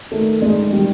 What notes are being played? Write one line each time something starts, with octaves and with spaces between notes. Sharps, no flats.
D#3 A3
G#3
G3